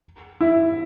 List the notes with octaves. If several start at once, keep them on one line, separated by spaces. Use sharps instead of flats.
E4